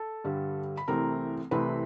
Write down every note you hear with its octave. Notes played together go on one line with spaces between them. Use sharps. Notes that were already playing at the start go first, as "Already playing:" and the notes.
Already playing: A4 A5
G2 D3 G3
B5
C2 C3 E3 A3 C4 A#4 A#5
C2 C3 E3 A3 C4 B4 B5